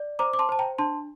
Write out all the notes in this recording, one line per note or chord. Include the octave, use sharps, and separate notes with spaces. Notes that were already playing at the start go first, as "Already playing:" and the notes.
Already playing: D5
C5 A#5 D6
D6
A5 C6
C5 A5
G5 A#5
D4 A5 C6